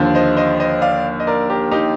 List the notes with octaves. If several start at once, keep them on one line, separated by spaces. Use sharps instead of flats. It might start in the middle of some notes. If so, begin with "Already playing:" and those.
Already playing: D#2 D3 F3
C5 D#5
C5 D#5
C5 D#5
D5 F5
D#5
A#4 D5
G4 A#4
D#4 G4